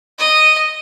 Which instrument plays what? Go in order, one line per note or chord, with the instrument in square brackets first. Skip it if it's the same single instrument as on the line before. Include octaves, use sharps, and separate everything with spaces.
[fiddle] D#5